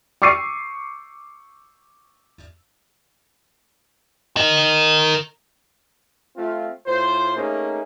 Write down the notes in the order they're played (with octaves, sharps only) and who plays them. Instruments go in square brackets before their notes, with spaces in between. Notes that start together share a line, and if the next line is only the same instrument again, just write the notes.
[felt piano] C#6 D6 E6 C7 C#7 D#7
[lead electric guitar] A#4 D#5
[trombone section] A3 C4 F4
A2 F4 C5
A3 A#3 C#4 D#4 G#4